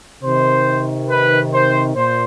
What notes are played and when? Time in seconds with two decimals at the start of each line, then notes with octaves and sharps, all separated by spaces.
0.23 C3 D#3 C5
1.09 B4
1.53 C5
1.95 A#2 C5